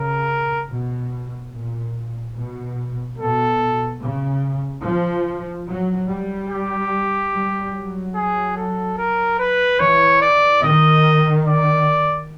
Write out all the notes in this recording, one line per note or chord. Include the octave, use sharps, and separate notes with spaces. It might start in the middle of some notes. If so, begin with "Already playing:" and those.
Already playing: C#3 A#4
B2
A#2
B2
B2 A4
C#3
F3
F#3
G3
G4
G3
F#3
G#4
A4
A#4
B4
E3 C#5
D5
D#3 D#5
D5